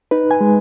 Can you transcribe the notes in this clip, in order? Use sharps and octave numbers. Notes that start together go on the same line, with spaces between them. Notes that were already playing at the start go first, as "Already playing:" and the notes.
D#4 B4
G#5
G#3